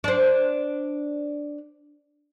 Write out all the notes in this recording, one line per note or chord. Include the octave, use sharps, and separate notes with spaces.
D4 C5